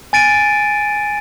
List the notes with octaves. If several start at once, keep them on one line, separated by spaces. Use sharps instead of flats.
G#5 A6 D7 D#7